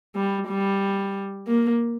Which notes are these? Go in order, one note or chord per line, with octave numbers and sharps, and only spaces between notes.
G3
G3
A#3